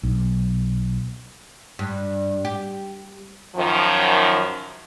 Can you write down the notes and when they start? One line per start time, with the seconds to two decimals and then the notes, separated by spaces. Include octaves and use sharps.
0.03 B1
1.79 G2
2.45 G4
3.56 F#2 D#3 F3